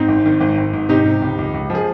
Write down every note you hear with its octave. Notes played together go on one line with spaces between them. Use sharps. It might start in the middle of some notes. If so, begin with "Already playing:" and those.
Already playing: G#2 C4 D#4
G#1
D#3
G#1
G#1
G#2
C3 D#4 G4
C3
C#2
C#2
C#2
F3 G#4